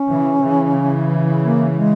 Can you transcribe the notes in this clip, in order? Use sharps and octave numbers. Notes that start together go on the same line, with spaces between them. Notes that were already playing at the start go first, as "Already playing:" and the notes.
Already playing: C#4
C#3 E3
C#3 E3
A#3
G#3